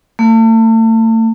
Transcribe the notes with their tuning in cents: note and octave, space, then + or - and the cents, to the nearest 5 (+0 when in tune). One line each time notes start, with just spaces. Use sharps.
A3 +35